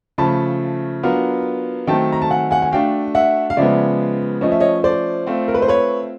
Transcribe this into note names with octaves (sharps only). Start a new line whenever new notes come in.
C#3 F3 A3 A5 B5
F#3 B3 D4 F4 A#4
D#3 F#3 A3 C4 G5 A5
A#5
A5
F#5 G#5
F#5 G#5
G#5
A3 D4 F#4 F5 G5
E5 F#5
F5
C#3 F3 G#3 B3 D5 E5
F3 A3 C#4 D#5
E5
C#5 D#5
C5 D5
A3 C4 F4
A#4
B4
C5
B4 C#5